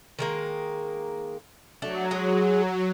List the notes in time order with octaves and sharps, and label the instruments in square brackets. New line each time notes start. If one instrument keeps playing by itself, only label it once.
[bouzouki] D#3 G#3 A#3
[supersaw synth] F#3 [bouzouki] A3 D4
[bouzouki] G#3 G#4